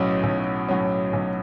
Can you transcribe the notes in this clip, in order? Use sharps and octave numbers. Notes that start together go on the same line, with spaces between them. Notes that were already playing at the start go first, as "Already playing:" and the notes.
Already playing: B1 A2 F#3 C#4
B1
A2 F#3 C#4
B1